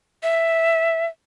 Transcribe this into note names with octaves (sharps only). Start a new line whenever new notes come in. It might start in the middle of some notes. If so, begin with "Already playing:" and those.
E5